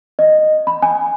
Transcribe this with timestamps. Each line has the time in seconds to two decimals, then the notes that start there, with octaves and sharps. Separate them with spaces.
0.19 D#5
0.67 B5
0.82 G#5